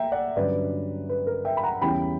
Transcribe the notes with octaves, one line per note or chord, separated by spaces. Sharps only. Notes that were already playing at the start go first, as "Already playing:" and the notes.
Already playing: A#3 E5 G5 A#5
D5 F#5
G2 D3 F#3 C#4 B4 D5
B4
A#4
E5 G5
B5
F#5 A#5
E2 C#3 G3 C#4 E4 G5 B5